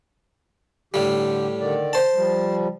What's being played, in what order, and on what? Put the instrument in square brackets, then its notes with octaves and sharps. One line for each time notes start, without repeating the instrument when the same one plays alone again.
[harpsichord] A2 G3 [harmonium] D3 G4
[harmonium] D3 D#3 D5
[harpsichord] C5 A5
[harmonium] F3 G3